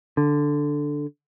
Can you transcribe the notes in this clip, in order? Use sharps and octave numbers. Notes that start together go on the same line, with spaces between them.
D3